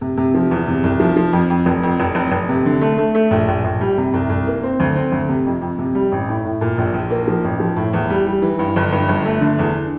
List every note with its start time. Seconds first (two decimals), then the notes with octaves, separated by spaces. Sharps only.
0.01 C3
0.17 C3
0.34 F3
0.51 E2
0.68 C3
0.84 C2
1.00 F3
1.16 F3
1.32 F2
1.50 F2
1.66 F1
1.83 F2
2.00 F1
2.15 F1
2.32 F1
2.49 C3
2.65 D3
2.81 A3
2.98 A3
3.15 A3
3.31 A#1
3.48 A#1
3.64 A#1
3.81 G3
3.98 C3
4.14 C2
4.29 C2
4.47 A#3
4.63 C4
4.80 D2
4.96 C4
5.12 D2
5.29 C3
5.46 F2
5.62 F2
5.78 C3
5.95 G3
6.12 A1
6.29 A2
6.44 A2
6.61 A#2
6.78 A#1
6.94 A#1
7.10 A#3
7.28 F3
7.44 A1
7.60 F3
7.76 A2
7.93 E2
8.10 G3
8.26 G3
8.42 E3
8.59 G2
8.76 G1
8.92 G2
9.09 G1
9.26 A3
9.41 D3
9.58 E2